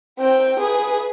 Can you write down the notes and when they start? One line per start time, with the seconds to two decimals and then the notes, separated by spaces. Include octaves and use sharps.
0.20 C4 G5
0.60 G#4 B4